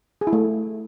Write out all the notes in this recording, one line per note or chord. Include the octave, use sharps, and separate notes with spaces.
G#4
E4
A3